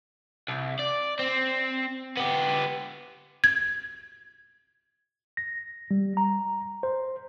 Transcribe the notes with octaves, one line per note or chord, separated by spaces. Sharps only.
C2
D5
C4
B3 G4
G#6
A#6
G3
A#5
C5